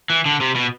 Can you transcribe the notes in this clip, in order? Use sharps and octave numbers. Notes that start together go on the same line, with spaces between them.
E3
D3
C3
B2